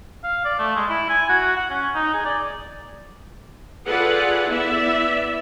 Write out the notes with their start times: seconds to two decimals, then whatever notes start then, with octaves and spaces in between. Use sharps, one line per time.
0.24 F5
0.45 D5
0.59 A3
0.75 G#3
0.89 E4
1.09 G#5
1.29 F#4
1.56 F#5
1.70 C#4
1.95 D#4
2.14 G#4
2.25 D5
3.87 F4 G#4 A4 B4 D5 F#5
4.50 B3 E4 D5 E5